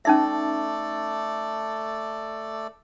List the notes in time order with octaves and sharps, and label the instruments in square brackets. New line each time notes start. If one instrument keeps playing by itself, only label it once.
[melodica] A3 A4 D5 [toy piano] C#4 D#4 E5